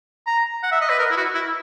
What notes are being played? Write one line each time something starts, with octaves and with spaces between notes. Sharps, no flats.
A#5
F#5
E5
D#5
B4
A#4
E4
F#4
E4